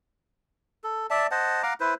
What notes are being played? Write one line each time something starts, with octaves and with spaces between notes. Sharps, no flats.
A4
D5 E5 A5
C5 D#5 F#5 A5
F5 F#5 A#5 D6
E4 B4 C5